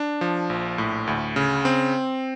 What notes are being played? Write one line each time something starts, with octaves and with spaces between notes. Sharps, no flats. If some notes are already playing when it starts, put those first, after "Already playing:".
Already playing: D4
F3
A#1
A2
D2
C#3
C4